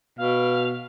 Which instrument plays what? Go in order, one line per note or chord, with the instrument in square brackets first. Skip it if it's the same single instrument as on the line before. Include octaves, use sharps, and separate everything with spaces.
[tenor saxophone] B2 [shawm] F5